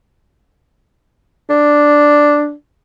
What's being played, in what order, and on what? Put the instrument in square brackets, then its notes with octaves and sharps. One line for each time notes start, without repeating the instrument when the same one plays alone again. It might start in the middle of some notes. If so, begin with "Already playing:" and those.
[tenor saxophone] D4